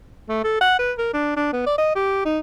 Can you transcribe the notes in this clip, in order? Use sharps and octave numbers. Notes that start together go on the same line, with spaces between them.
A3
A4
F#5
B4
A#4
D4
D4
B3
D5
D#5
G4
D#4